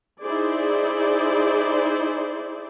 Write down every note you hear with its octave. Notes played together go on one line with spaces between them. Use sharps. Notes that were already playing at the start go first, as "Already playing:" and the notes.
D#4 E4 G#4 C5 D5